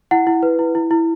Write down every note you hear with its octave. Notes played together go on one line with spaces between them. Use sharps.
E4 F#5
E4
B4
E4
E4
E4